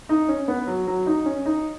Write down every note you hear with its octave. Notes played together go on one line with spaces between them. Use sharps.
D#4
C#4
B3
F#3
F#3
D#4
C#4
D#4